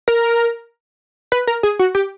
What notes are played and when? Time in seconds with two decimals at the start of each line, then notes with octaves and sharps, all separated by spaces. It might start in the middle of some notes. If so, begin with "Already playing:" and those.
0.08 A#4
1.32 B4
1.47 A#4
1.63 G#4
1.79 F#4
1.95 G4